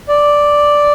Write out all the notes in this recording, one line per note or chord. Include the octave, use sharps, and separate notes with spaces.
D5